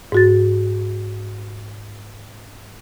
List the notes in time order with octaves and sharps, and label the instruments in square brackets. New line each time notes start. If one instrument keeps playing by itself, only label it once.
[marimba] G#2 F#4 A6